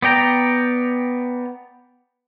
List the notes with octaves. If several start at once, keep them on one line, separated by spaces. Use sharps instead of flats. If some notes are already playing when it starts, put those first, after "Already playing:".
B3 D5 G5 A#5